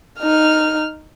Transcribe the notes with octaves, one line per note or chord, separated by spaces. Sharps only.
D#4 F6